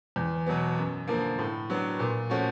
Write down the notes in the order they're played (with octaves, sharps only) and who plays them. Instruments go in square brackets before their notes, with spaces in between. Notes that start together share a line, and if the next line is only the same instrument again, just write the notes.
[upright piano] E2
B2 F#3 B3
F#2
D3 F3 A#3
A2
F#3 B3 D4
A#2
F3 A3 C#4 F#4